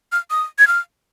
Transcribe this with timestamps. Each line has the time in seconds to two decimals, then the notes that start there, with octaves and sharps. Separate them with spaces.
0.12 F6
0.30 D#6
0.59 G#6
0.67 F6